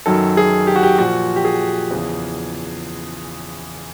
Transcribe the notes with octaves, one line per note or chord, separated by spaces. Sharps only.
F#2 D#3 F#3 A4
G#4
G4
F#4
G4
A#2 F3 F#4
G4
G#4
E2 C#3 F3